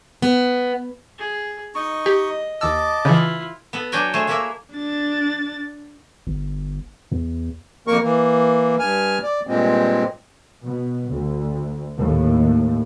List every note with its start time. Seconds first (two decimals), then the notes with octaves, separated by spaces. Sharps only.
0.22 B3
1.18 G#4
1.75 D#4 D#5 C#6
2.06 G4
2.61 D#2 D#5 A5 D6 E6
3.05 C#3 E3 E4 F4
3.73 B3 A4
3.92 F#3 D4 F#4 G5 G#5 A#5
4.14 A3 G#4 C5 C#5
4.27 A3 A#3 E4 G#4 A#4 E5
4.74 D4 A6
6.27 G1
7.12 E2
7.87 F2 A#3 A#4 C#6
8.03 E3 A#3
8.79 G2 G#5 F6
9.23 D5
9.47 G2 A#2 G#3 C4
10.63 B2
11.09 D2
11.98 D#2 A2